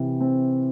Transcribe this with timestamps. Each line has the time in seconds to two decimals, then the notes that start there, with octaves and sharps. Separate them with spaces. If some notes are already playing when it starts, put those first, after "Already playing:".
Already playing: C3 E3
0.20 C4